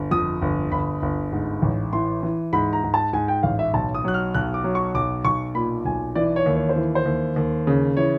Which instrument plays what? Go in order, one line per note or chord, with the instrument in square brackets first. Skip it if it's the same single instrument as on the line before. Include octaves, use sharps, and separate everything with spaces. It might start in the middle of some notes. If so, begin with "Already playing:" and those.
Already playing: [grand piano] G1
F2 D#6
G1
G1 B5
G1
G#2
A1
E3 C6
E3
G#2 B5
A#5
G#2
A5
G#2 G#5
G5
A1 F5
E5
B1 A5
D#6
F#3 F#6
F6
B1 F#6
D6
F#3
C#6
B1 D6
B1 C#6
A#2 B5
B1 G#5
E3 D5
C#5
D#2
C#5
C5
E3
C5
D#2
D#2
C#3
E3 C#5